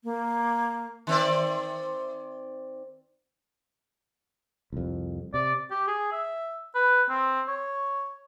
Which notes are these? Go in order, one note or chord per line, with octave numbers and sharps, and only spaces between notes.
A#3
D#3 C4 D5
C2 F2
C3 D5
G4
G#4
E5
B4
C4
C#5